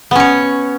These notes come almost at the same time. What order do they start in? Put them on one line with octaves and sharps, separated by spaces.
B3 C#4 C#5